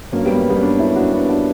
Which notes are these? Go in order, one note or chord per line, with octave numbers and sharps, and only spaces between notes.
G2 F#3 A#3 C#4
G3 B3
A#3
G3 B3
C#4
B3 D4
C#4 E4
D4 F#4
B3 D4
D4 F#4